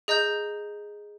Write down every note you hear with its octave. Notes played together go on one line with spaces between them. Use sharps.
G#4 D#5 A#5 G6